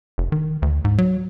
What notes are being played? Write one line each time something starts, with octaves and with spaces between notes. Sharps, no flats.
F1
D#3
D2
G#2
F#3